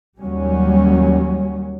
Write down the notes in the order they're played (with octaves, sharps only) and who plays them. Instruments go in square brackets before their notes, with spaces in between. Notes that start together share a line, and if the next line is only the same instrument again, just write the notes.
[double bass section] D#2 F#3 G3 C#4